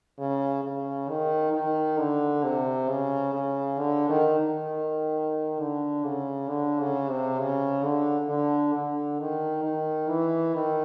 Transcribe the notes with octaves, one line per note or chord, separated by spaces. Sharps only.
C#3
C#3
D#3
D#3
D3
C3
C#3
C#3
D3
D#3
D#3
D3
C#3
D3
C#3
C3
C#3
D3
D3
D3
D#3
D#3
E3
D#3